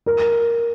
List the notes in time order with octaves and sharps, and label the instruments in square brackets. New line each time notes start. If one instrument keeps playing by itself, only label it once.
[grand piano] A#4